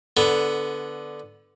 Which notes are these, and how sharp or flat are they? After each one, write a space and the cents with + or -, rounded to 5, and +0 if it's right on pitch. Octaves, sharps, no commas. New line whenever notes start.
D3 +0 B3 +0